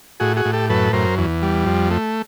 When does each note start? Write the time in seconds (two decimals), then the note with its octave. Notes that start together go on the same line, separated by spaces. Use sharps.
0.20 A2 F#4 G#4
0.36 F#4 G#4
0.45 A2
0.53 G4 A4
0.70 F#2 A4 B4
0.93 F#2 A#4 C5
1.18 E2
1.42 G3
1.66 F2
1.91 A3